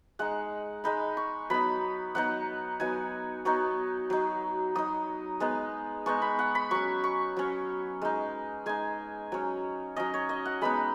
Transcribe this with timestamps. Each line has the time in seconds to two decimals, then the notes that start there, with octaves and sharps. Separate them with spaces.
0.19 G#3 D#4 F#5
0.84 G#3 D#4 B5
1.17 C#6
1.50 F#3 B3 D#4 B5
2.15 F#3 B3 D#4 F#5
2.80 F#3 B3 D#4 G#5
3.45 F#3 B3 D#4 C#6
4.10 F#3 D#4
4.75 F#3 D#4 D#6
5.40 G#3 B3 D#4
6.06 G#3 B3 D#4 C#6
6.22 B5
6.39 F#5
6.55 B5
6.71 F#3 C#4 C#6
7.04 C#6
7.37 F#3 C#4
8.02 G#3 D#4
8.66 G#3 D#4 G#5
9.32 F#3 C#4
9.96 F#3 C#4 D#5
10.14 C#5
10.29 D#5
10.45 F#5
10.61 G#3 B3 D#4 B5